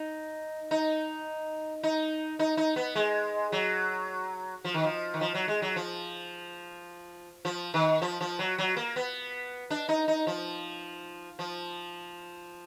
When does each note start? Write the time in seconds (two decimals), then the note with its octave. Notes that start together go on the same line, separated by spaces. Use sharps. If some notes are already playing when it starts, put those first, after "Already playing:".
Already playing: D#4
0.71 D#4
1.83 D#4
2.39 D#4
2.57 D#4
2.76 B3
2.95 G#3
3.52 F#3
4.65 F3
4.74 D#3
4.84 F3
5.14 D#3
5.21 F3
5.35 F#3
5.48 G#3
5.62 F#3
5.76 F3
7.45 F3
7.74 D#3
8.02 F3
8.21 F3
8.39 F#3
8.58 F#3
8.76 A#3
8.96 B3
9.70 D4
9.89 D#4
10.08 D#4
10.27 F3
11.39 F3